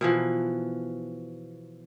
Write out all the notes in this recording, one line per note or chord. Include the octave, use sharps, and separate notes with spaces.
B2 E3 F3